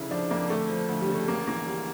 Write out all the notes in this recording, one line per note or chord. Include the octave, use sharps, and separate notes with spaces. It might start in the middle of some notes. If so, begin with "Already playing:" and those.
Already playing: F1 C#3 E4
F3 D4
F2 A#3
D2 A3
F3
D2
G3
C#3
A3
A1 A#3
E3 A#3
A1 G3